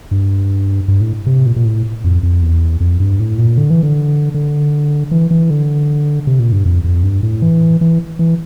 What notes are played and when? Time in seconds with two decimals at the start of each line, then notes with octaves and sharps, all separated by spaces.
0.11 G2
0.88 G2
1.01 A2
1.26 C3
1.46 A#2
1.56 A#2
1.65 A2
2.04 F2
2.23 F2
2.42 E2
2.80 F2
3.00 G2
3.20 A2
3.38 A#2
3.58 D3
3.70 E3
3.83 D3
4.34 D3
5.11 E3
5.31 E3
5.50 D3
6.27 C3
6.39 A#2
6.52 G2
6.66 F2
6.84 F2
7.03 G2
7.23 A2
7.42 E3
7.81 E3
8.19 E3